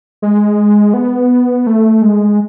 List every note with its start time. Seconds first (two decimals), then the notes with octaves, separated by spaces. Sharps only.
0.22 G#3
0.94 B3
1.67 A3
2.02 G#3